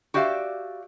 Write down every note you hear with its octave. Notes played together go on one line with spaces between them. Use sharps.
F#4 G4 D5 E5 F5